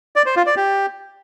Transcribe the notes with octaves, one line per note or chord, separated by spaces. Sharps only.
D5
C5
F4
D5
G4